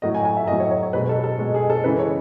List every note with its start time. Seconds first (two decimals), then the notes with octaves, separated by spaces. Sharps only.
0.02 A2 F#3 D#5
0.14 G#5
0.25 G#5
0.37 E5
0.47 A2 F#3 D#5
0.60 C#5
0.71 C#5
0.83 C#5
0.93 B2 G#3 B4
1.09 A4
1.24 A4
1.39 B2 G#3
1.55 G#4
1.70 A4
1.84 C#3 E3 G#3 B4
1.99 C#5